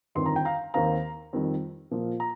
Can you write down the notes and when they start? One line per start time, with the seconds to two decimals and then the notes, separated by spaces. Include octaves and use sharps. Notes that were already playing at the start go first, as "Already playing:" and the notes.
0.15 G1 F2 D#3 C6
0.26 A#5
0.36 G5
0.45 F5 A#5
0.74 D#2 D#3 C4 F5 A#5
1.33 F2 D#3 G3
1.91 A#2 F3 A#3 F4
2.20 A#5